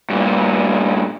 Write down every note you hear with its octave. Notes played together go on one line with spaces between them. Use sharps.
G2 A#2